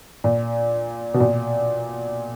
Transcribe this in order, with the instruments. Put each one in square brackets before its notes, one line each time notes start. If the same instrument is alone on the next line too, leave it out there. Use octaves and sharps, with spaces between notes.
[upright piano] A#2
B2
A#2